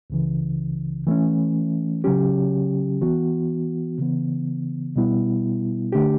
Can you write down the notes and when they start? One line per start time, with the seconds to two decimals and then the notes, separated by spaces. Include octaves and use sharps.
0.10 C#2 C#3 E3
1.07 E3 A3 C#4
2.04 C#3 F#3 C#4 G4
3.01 E3 B3 F#4
3.98 C#3 E3 B3
4.96 B2 G3 B3 E4
5.92 D3 A3 D4 G4